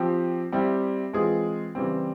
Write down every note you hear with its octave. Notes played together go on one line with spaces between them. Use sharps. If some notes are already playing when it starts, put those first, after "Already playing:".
Already playing: F3 C4 G4
G3 C4 E4 G4
E3 G#3 C4 F4 G#4
C#3 E3 G3 C4